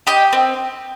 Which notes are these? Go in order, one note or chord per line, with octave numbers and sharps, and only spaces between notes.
G4 D#5 G5
C4